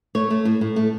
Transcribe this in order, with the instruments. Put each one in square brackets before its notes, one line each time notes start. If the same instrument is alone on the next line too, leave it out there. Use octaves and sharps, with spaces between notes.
[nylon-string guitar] A3 C#5
A3
A2
A2
A3